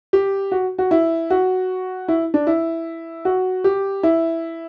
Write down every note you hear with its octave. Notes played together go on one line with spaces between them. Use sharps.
G4
F#4
F#4
E4
F#4
E4
D4
E4
F#4
G4
E4